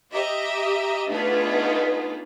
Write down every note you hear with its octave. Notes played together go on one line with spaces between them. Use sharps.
G4 D#5 E5 A#5
A3 B3 D4 D#4 F4 G#4